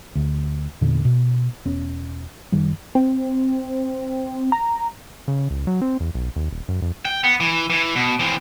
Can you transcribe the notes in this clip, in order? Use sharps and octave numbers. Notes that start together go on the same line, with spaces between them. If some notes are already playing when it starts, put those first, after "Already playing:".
D2
E2 A#2 D3
B2
E1 B3 C#4
F#1 D#3 G3
C4
A#5
C#3
C#2
F#3
C4
E2
B1
D#2
D#1
F#2
F2
G5
B3
E3
E3
B2
E3 C4